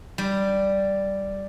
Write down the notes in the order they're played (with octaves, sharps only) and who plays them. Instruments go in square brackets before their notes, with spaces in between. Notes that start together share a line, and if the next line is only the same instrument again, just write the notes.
[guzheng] G3